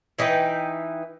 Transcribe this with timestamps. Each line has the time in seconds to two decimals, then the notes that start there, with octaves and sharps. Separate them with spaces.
0.19 E3 D#4 B4 G5